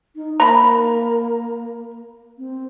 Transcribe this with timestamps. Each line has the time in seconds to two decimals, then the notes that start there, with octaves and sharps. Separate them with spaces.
0.16 D#4
0.40 A#3 A#5 B5
2.38 C4